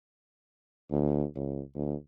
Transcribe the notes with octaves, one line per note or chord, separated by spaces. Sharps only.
D2
C#2
D2